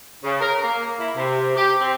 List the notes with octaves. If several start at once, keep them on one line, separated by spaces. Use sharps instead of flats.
C#3
A#4
A#3
E4
C3
G4
C4